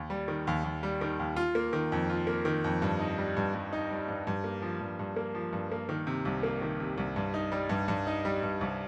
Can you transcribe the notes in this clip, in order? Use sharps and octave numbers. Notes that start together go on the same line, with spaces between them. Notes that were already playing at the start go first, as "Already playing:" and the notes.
Already playing: D#2
G3
D#3
D#2
D#2
G3
D#3
D#2
F4
A#3
D#3
F2
F4
A#3
D#3
F2
G2
D#4
G3
G2
G2
D#4
G3
G2
G2
A#3
F3
G2
G2
A#3
F3
G2
A#3
D#3
C3
C2
A#3
D#3
C3
C2
G2
D#4
G3
G2
G2
D#4
G3
G2
C2